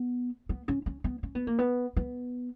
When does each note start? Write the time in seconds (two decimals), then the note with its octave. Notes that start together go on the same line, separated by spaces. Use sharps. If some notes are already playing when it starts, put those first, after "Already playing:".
Already playing: B3
0.49 B3
0.68 C#4
0.86 C#4
1.04 B3
1.23 C#4
1.35 B3
1.47 A#3
1.59 B3
1.97 B3